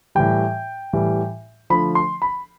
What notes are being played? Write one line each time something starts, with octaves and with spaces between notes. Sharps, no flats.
A2 E3 G3 G5
A2 E3 G3
D3 F3 A3 B5
C6
B5